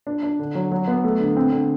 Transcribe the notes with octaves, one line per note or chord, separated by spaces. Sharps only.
D4
D4
D3
F#3
F#3
B3
A3
D3
C4
D3